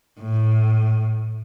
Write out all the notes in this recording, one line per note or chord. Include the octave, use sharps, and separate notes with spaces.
A2